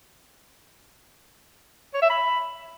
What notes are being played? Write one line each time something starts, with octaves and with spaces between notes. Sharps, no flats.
C#5
E5
B5